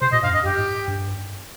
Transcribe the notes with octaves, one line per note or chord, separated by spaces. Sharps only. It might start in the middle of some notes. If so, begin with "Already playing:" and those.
C3 C5
A#2 D#5
G2 F5
F2
G2 D#5
G2 G4
G#2
G2